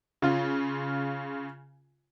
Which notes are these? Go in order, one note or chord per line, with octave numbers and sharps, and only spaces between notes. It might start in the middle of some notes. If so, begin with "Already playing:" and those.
C#3 F4